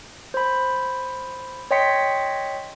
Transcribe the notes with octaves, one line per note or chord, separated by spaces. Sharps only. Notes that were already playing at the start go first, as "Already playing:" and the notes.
C5 B5
C#5 D#5 G5 C6 B6 C#7